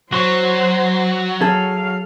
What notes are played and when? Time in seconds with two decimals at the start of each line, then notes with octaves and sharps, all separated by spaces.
0.12 F#3 F#4 C5 C6 C#6
1.41 F#3 G#4 A4 F5